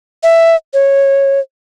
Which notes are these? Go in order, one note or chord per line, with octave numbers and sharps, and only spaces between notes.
E5
C#5